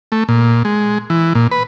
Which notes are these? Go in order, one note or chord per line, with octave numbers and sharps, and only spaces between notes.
A3
A#2
G#3
E3
A#2
B4